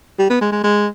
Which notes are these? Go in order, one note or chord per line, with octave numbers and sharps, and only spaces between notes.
G3
B3
G#3
G#3
G#3